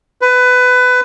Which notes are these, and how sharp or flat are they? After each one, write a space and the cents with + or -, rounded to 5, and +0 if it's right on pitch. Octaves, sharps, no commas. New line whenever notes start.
B4 +20